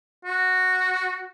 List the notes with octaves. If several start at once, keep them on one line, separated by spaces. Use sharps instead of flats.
F#4